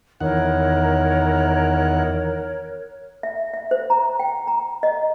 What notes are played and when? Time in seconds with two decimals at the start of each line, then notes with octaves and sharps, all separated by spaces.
0.20 E2 D#3 A#4 C#5 F#5
3.23 E5
3.54 E5
3.71 C5
3.90 A#5
4.20 G5
4.47 A#5
4.83 D#5